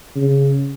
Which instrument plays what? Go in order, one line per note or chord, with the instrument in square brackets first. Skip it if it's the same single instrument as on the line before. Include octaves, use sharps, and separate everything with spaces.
[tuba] C#3